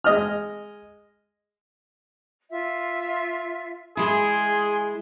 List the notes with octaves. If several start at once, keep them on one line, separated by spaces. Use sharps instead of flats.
G#3 D#5 F6
F4 E5
G#3 E4 G#4 C6